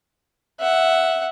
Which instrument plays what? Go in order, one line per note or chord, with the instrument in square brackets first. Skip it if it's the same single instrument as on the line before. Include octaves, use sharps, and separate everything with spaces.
[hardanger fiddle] E5 F#5